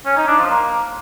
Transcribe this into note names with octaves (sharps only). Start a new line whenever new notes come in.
C#4
D#4
D4
F3
A#3